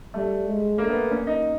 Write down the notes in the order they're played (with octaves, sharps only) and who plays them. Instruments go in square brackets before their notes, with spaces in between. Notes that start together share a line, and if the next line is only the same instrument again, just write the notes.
[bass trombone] G3 [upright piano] A3
[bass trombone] G#3
[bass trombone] A3 [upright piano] A#3
[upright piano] B3
[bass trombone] A#3 [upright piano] C#4
[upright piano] D#4